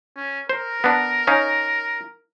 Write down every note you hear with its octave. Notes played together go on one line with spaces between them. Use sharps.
C#4
A#4 C5
B3 D4
C#4 D#4 F5